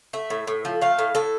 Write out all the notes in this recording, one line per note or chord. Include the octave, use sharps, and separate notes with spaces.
A3 E5
A2
A2
F3
A3 F5
A2
A2 A4